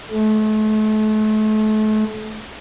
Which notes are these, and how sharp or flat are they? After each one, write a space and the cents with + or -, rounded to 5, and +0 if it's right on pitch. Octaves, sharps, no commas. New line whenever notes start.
A3 -35